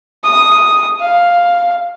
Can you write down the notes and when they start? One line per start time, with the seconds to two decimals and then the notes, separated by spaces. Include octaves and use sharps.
0.24 D#6
1.01 F5